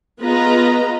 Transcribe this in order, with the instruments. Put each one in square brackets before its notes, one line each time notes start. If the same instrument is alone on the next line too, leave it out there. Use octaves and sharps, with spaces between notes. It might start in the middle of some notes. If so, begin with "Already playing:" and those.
[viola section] B3 F4 G#4 B4 D#5 A#5